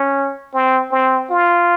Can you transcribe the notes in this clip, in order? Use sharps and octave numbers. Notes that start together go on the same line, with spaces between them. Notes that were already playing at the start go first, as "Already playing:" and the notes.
Already playing: C#4
C4
C4
F4